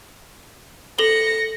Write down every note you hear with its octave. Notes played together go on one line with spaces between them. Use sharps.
A4 A#6 C#7 F#7 G7